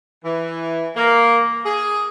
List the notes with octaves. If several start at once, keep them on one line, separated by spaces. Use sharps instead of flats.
E3
A#3
G#4